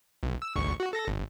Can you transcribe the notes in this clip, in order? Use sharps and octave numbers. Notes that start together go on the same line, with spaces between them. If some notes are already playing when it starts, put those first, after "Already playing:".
B1
E6
G#1 D2 C#6
F#4
A4 A#6
G1